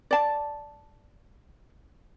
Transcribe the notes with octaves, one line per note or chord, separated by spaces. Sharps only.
D5 A5